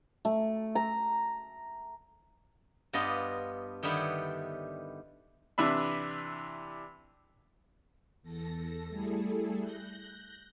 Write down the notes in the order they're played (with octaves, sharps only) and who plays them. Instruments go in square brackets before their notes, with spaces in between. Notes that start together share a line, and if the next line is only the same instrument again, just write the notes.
[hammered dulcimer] A3
A#5
[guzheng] G2 B3 F4 D5 D#5
D3 D#3 G3 B3 E4
[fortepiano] C3 E3 D4 E5 B5
[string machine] E2 A4 A#6
G3 A3 E4 G#4 A4
F#6 G6 A#6